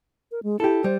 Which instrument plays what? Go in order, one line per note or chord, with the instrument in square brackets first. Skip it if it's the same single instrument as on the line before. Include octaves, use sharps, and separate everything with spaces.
[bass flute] A#4
G#3
[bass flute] E4 [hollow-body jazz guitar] G4 A4
[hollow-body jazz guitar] G3 [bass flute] C5